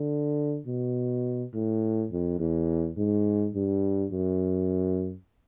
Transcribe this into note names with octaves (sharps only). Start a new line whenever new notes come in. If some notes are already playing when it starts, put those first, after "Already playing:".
Already playing: D3
B2
A2
F2
E2
G#2
G2
F#2